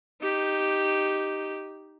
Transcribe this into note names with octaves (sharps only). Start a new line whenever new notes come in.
D#4 G4